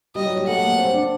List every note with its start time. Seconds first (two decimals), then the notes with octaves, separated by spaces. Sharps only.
0.15 G3 D#5
0.25 F#3
0.37 G3
0.47 A3 F#5
0.62 A#3
0.79 C4
0.94 D4